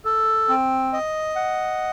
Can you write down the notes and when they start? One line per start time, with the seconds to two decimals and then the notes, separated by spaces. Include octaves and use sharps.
0.05 A4
0.49 C4
0.93 D#5
1.36 F#5